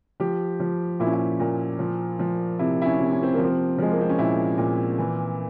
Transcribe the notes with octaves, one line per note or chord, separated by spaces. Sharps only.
F3 G4
F3
A#2 E4
C#4
E4
A#2
F3
F3
C3 E4
E4
C#4
C3
C#4
C4
F3 A#3
C4
F3 G#3
A#3
C4
C#4
A#2 E4
A#2
E3